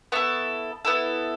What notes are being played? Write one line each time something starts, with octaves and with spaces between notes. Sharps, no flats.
B3 E4 A4 C#6
B3 E4 A4